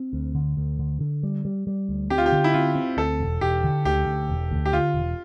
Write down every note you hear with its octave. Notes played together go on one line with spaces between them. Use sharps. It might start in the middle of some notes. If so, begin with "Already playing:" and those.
Already playing: C4
D2
D3
D2
D3
D3
G3
G3
G3
D2
C4 G4
F4
G4
D3
E4
C4 F4
C4
D2 A4
E1
E1 G4
D3
D2 G4
D2
E1
D2
G4
D3 F4
E1